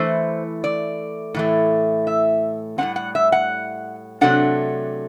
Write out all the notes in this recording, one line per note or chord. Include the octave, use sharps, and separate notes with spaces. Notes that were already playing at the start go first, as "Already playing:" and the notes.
Already playing: E3 A3 E4 C5
D5
A2 E3 A3
E5
A2 G3 C4 F#5
F#5
E5
F#5
C3 F#3 A3 D4 F#5